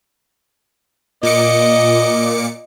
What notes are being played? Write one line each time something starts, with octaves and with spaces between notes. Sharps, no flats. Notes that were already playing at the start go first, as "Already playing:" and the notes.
A#2 D#5 D6 C#7